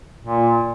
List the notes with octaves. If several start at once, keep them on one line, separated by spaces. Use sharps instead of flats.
A#2